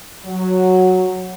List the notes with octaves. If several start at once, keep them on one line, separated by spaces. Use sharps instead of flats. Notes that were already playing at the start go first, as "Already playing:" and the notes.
F#3